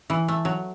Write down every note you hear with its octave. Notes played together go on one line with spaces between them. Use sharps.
E3
A3
F#3